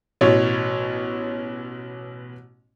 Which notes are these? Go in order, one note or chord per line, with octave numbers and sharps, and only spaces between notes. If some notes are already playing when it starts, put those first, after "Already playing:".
A1 B2 C#5